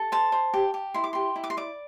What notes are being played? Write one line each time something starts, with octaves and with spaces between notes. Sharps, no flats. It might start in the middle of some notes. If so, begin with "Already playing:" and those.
Already playing: A4
C5 A5
C5
G4
G4
E4 C6
D6
G4 C6
E4
D6
C6
D5 D6